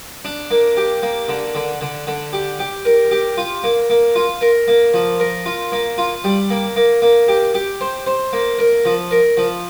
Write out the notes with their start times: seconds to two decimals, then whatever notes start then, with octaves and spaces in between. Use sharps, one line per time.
0.25 D4
0.51 A#3
0.77 G4
1.03 A#3
1.28 D3
1.55 D3
1.81 D3
2.07 D3
2.33 G4
2.59 G4
2.85 A#4
3.11 G4
3.37 F4
3.63 A#3
3.90 A#3
4.16 F4
4.41 A#4
4.68 A#3
4.94 F3
5.20 A#4
5.46 F4
5.72 A#3
5.98 F4
6.24 G3
6.50 A#3
6.76 A#3
7.02 A#3
7.28 G4
7.54 G4
7.81 C5
8.07 C5
8.33 A#3
8.59 A#4
8.85 F3
9.11 A#4
9.37 F3